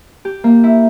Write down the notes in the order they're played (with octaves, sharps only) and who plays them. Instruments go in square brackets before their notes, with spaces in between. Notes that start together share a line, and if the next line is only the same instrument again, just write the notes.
[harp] G4
A#3
E4